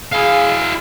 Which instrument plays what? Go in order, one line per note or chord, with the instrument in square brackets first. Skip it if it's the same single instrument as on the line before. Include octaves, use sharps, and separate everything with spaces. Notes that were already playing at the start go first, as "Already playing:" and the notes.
[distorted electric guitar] E4 F5 [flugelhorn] G#4